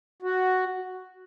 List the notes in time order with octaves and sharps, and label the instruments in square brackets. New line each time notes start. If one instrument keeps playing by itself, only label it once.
[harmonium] F#4